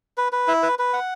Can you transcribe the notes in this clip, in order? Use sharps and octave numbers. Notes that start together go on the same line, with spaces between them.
B4
B4
E4
B4
B4
F#5